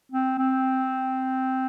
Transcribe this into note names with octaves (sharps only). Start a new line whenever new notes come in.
C4
C4